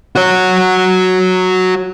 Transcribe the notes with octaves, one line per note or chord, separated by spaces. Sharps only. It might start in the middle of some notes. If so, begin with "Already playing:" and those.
F#4 C#5